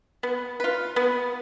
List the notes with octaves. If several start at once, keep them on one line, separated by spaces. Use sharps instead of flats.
B3
F4 B4
B3